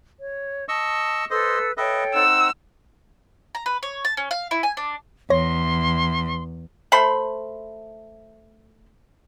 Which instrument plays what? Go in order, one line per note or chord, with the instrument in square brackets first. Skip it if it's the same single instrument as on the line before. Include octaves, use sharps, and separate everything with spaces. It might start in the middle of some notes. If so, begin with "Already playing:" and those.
[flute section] C#5
[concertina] D#5 C#6 E6 [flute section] A5
[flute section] A4 B4 E6 [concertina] C5 D#5
[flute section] A4 C#5 G5 [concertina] B4 D#5 E5
[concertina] C4 D#4 F#5 [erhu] E6
[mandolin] A#5
B4
C#5
A5
C#4
F5
E4
G#5
D4
[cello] E2 [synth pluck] C#5 A#6 [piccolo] C6
[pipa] A3 C5 B5 C6